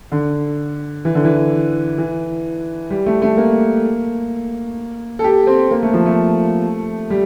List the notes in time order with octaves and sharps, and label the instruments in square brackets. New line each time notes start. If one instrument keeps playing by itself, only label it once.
[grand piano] D3
E3
D3
E3
E3
G3
A3
A3
A#3
A4
G4
C4
A#3
A3
F3
A3
G3